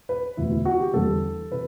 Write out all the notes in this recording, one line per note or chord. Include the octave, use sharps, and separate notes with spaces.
B4
E1 D2 C3 E3 E4
E4
F#4
G4
E2 D3 G3 A4
C3 E3 B4